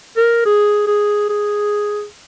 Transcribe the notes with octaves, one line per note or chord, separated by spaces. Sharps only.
A#4
G#4
G#4
G#4